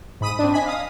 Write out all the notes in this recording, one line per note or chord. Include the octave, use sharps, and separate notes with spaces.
G#2 B5 D#6 D#7
C4 D4
D#5 G#5 B5
F5 D#6